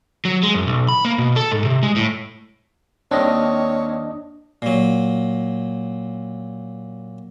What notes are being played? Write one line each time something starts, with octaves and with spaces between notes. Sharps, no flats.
F#3
G#3
F#2
B1
B5
A#3
B2
A4
G#2
C3
G#3
A2
D#2 D#3 C4 D4 C#5 D#5
A#2 F#3